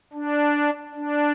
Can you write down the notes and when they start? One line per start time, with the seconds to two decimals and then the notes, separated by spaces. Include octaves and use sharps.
0.13 D4
0.95 D4